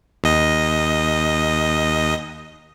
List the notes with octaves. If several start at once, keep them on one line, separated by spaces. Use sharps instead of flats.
D#2 D#5